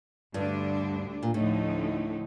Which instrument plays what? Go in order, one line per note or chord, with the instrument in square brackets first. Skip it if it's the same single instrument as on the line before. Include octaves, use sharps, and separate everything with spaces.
[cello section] D2 D3 G3 D4 [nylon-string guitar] G2
[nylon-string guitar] A#2
[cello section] D2 D3 F3 A3 D#4 [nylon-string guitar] A2